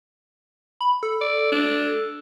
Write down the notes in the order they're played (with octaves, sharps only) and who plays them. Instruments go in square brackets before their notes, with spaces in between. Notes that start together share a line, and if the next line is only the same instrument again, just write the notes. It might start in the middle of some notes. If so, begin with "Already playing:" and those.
[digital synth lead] B5
A4
[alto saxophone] D5
D4